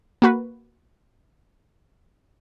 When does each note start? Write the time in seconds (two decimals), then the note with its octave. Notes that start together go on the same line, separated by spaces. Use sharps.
0.22 A#3 F#4 B4